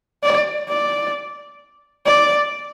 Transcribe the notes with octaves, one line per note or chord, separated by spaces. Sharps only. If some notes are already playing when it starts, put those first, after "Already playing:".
D5
D5
D5